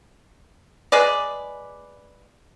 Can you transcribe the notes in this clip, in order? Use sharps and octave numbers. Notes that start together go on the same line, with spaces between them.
G#3 G#4 B4 D5